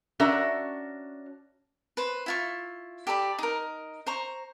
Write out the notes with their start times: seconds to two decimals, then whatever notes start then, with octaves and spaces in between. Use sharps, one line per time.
0.20 C#4 D4 F#4 A#4 E5
1.97 B4 C5
2.26 E4 F4 C#6
3.07 G4 A4 D5 B5
3.39 D#4 A#4
4.07 C5 A#5 C#6